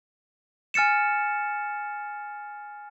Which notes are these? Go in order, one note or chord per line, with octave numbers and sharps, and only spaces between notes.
G#5 F6 A6 C#7 E7